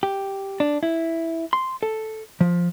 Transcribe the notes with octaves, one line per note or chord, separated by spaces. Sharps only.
G4
D4
E4
C6
A4
F3